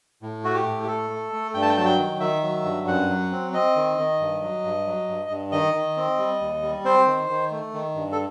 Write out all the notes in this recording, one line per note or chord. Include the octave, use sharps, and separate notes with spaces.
A2
A3 F#4
G4
A2
G4
A3 A4
A3
A3
G2 G5
A5
G5
F#3 A5
G5
D#3
D#3 E5
F#3
G2
F#2 F#5
F#3
C4
C4 D#5
D#3
D#3
G2
F#3
G2
F#3
G2
G2
D#3 D#5
D#3
C4
G3
D#2
G3
C4 C5
D#3
D#3
A3
D#3
G2
A4